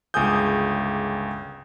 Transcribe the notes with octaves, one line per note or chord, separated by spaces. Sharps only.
G1 C#2 G#4 G#5 D#6 G6